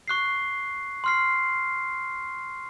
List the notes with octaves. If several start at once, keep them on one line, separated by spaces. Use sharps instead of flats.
C#6 F#6 C7
C6 F6 C7